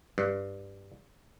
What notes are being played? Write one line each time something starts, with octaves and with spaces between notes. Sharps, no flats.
G2